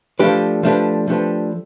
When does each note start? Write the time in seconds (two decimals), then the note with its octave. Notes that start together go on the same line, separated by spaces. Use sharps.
0.19 F3 A3 D4 G4 B4
0.63 F3 A3 D4 G4 B4
1.08 F3 A3 D4 G4 B4